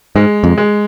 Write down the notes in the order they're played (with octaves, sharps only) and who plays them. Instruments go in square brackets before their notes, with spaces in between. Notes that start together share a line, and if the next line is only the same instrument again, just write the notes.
[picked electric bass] G#2 [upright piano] G#3
[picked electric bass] F2
[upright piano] G#3